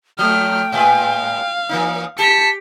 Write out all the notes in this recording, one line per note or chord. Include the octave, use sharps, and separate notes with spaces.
F3 A3 G5 F6
A2 G#3 B4 F5
E3 A#3 D#4
G4 A5 B6 C#7